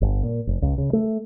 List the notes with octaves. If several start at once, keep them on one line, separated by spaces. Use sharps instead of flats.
G1
A#2
F1
C#2
C#3
A3